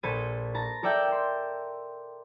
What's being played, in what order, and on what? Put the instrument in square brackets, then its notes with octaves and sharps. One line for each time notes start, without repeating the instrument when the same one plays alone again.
[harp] A#1 A4 C5 B5 G#6 D#7
A5 A#5 A#6
A4 A#4 D5 E5 G5 A5
G5 C6